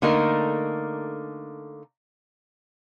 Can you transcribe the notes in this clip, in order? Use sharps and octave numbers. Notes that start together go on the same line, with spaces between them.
D3 A3 A#3 D#4 A#4